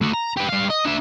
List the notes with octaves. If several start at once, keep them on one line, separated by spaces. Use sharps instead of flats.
A3 F#4
A#5
G4 B4
G2 F5
D#5
D4 E5